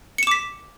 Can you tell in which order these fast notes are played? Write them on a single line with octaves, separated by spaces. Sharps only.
C#7 E7 D6 B6